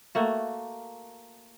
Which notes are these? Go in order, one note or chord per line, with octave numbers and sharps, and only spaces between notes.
A3 A#3 F#4